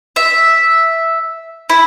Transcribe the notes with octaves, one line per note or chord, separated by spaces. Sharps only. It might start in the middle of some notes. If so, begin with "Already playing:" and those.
E5
E4